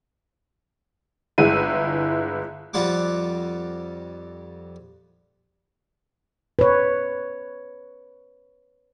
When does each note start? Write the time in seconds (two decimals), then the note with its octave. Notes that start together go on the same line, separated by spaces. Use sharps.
1.38 G1 G#3 E4 D#7
2.74 F2 G3 F4 F#5 D6
6.59 B4 C#5